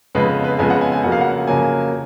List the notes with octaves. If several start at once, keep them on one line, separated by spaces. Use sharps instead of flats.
F2 C#3 G#3 B3 B4
B4
F2 C#3 G#3 B3 G#5
F#5
G#5
G#5
F2 C#3 F#3 A#3 F#5
F5
F#5
F2 C#3 F#3 A#3 G#5